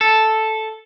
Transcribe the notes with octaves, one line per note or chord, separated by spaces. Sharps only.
A4